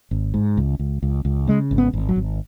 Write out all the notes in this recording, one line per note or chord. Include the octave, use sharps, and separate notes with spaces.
G#1
G#2
C#2
C#2
C#2
C#2
C#3 G#3
G#1
B3
G#1
F#3
G#1